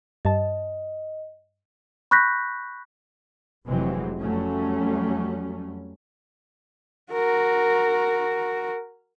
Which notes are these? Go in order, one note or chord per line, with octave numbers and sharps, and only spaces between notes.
G2 D#5 A5
B5 C#6 F#6 G6 A#6 B6
F1 C3 E3 F#3 G#3 C4
F2 F#3 G3 A3 C#4
F#4 A#4